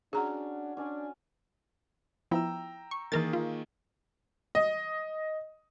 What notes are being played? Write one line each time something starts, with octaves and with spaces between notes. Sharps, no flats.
C#4 D4 F#4 G#4 A#5
C#4 D4 D5 G#5
F3 B3 E4 G5 A#5 E6
C#6
D#3 E3 A#3 G#4 A#4 A6
F4
D#5